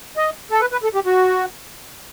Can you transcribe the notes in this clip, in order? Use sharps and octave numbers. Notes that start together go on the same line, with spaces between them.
D#5
A4
B4
B4
A4
G4
F#4